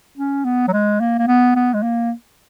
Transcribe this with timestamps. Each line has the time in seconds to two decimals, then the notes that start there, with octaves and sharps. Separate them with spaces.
0.18 C#4
0.45 B3
0.68 F#3
0.73 G#3
1.01 A#3
1.19 A#3
1.28 B3
1.56 B3
1.74 G#3
1.83 A#3